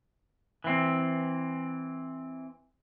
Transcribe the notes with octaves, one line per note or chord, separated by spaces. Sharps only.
E3 C4